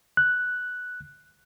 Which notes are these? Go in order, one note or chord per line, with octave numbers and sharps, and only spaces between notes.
F#6